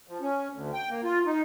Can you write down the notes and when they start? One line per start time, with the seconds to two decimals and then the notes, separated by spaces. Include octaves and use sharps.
0.08 F3
0.21 C#4
0.52 D2
0.73 G5
0.89 A#3
1.04 F4
1.26 D#4